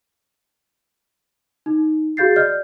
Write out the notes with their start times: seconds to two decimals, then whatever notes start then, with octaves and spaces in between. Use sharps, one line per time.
1.66 D#4
2.17 F#4 G#4 F5 G6 A6 C7
2.36 D5 D#5 F6 G6